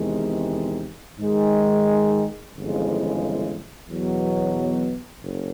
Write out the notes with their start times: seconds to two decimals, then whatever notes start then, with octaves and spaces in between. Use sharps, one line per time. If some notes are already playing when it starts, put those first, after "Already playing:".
Already playing: E2 C3 D#3 G#3
1.18 G#2 D#3 G#3
2.53 G1 F2 C#3 E3 G#3
3.87 E2 B2 F#3 B3
5.23 F#1